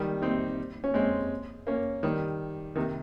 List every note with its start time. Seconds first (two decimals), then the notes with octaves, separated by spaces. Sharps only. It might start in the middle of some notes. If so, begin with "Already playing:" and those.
Already playing: D#3 G3
0.22 C4 D#4
0.84 C#4
0.94 G#3 C4
1.67 A#3 C#4
2.03 D#3 G3
2.76 C3 D#3